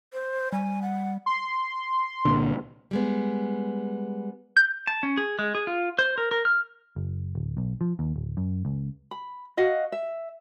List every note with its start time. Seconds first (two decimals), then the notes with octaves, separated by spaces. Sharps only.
0.13 C5
0.52 G3 G#5
0.82 F#5
1.26 C6
2.25 C2 A#2 D3
2.91 G3 G#3 B3
4.57 G6
4.87 A5
5.03 C#4
5.17 G#4
5.39 G#3
5.55 G#4
5.67 F4
5.99 C5
6.18 A#4
6.31 A#4
6.45 F6
6.96 F#1
7.35 D1
7.57 B1
7.81 F3
7.99 D#2
8.16 D1
8.37 F#2
8.65 C#2
9.11 B5
9.57 F#4 D#5 F5
9.92 E5